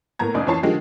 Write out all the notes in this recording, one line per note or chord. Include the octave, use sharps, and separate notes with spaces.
A2 A#3 B3 A#5 G#6
F#1 C#2 D#4 D5 D#6
F2 E3 C#5 A5 C7
D3 D#3 F3 G3 G#3